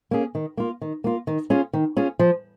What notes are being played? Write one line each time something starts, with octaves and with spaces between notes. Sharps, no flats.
A#3 C#4 G#4
D#3
A#3 F4
D#3
A#3 F4
D#3
C#4 F4 G#4
D#3
C#4 F4 G#4
F3